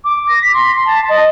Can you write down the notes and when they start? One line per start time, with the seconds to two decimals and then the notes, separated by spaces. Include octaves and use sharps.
0.04 D6
0.28 A#6
0.42 B6
0.54 C6
0.85 A5
1.09 D#5